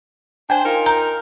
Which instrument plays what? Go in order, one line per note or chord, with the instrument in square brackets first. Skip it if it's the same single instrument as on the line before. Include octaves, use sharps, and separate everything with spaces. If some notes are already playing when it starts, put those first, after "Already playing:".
[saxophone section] D4 C5 [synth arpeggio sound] G5 G#5
[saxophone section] D#4 F4 A#4
[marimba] A#5 [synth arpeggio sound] G6